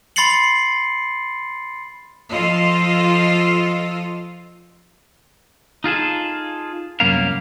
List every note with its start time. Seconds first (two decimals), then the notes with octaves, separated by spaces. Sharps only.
0.16 B5 C6 A6 C7 C#7 F#7
2.31 F3 F4 A4 D#5
5.84 D#4 F4 G#4 A4
7.00 C2 F#2 A#3 B3 A#4 F5